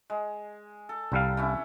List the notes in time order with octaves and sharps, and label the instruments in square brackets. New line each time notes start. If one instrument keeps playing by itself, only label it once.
[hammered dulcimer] G#3
A4
[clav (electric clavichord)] C2 G3 F5 [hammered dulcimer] D4
[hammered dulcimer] C3 C#4 E4